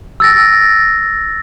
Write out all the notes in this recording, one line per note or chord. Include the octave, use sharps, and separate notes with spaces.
E6 A6 A#6